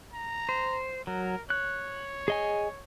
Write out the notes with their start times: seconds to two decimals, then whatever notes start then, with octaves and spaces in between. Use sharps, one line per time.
0.13 A#5
0.49 C5
1.07 F#3 A#4
1.50 C#5 F#6
2.28 G#4 D#5 G#5